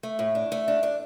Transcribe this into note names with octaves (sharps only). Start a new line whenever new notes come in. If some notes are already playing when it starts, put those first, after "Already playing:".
A3
A2
D4
A3
D4
D4